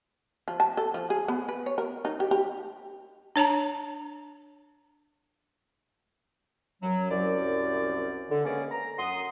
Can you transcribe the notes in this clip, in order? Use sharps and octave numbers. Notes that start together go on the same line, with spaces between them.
F3
A5
A4
F3
G#4
B3
B4
C#5
A#4
D#4
G4
G4
D4 C#5 A5 A#5
F#2 F#3
C2 F#2 D5
D3
G#3 A#3 B3 C#4 G#4 D5
A#5
F#2 F#5 C6 D#6